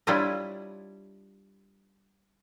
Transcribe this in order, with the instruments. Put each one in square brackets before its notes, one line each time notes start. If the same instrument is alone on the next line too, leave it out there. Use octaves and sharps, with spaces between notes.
[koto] G3 D4 E4 F4 C#5 D#5